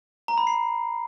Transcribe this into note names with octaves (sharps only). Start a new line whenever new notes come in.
A#5
B5
C7